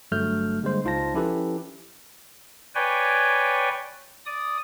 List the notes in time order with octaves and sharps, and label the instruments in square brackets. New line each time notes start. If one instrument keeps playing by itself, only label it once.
[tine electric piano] G1 G2 F#3 A3 F6 G6
D3 G3 G#3 A#3 C5
C#2 D#4 F4 C5 A5 A#6
F3 C#4 E4 G4 A4 B4
[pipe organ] B4 C#5 D5 G5 G#5
D5 D#6